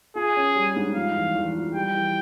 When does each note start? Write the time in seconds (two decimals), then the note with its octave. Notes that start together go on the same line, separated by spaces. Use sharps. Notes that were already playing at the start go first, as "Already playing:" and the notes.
0.15 F4 G#4
0.37 C#4
0.56 G3
0.76 G#2
0.96 F3 F5
1.15 E2
1.35 E2
1.55 F3
1.75 G3 G5
1.95 E3